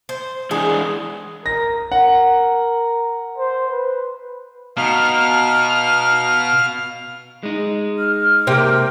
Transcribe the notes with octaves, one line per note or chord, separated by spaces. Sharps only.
C5
E3 G#3 D4 G#4
A#4 A#6
A#4 F#5
C5
B4
B2 D#4 F5 F6
G#3 D#4
F6
C3 A#3 G5